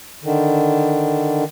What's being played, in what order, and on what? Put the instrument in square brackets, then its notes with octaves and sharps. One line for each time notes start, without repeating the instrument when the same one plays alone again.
[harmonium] D3 D#3